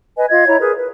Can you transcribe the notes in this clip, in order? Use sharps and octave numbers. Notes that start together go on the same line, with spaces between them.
B4 D#5 G#5
F4 D#5 F5 G#6
E4 C#5 A#5
G#4 A#4 B4
B4